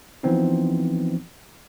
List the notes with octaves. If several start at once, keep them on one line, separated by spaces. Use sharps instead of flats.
E3 F3 B3 C4 D#4